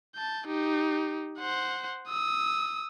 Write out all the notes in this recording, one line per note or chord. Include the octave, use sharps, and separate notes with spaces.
A5 G6
D#4 G4
C5 F#5
D#6 E6